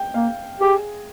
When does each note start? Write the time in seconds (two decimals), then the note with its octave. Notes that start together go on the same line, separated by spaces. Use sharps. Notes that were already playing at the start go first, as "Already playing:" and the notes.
Already playing: G5
0.14 A#3 F5
0.60 G4 G#4